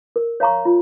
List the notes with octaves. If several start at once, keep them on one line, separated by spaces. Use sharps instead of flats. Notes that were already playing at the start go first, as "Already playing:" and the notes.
A#4
C#5 F5 A#5 C#6
F4